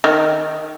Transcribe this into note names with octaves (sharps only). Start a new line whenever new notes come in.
D#3